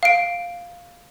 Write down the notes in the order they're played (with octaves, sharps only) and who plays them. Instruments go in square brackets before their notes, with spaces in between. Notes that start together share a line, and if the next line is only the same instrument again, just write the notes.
[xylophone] F5 D7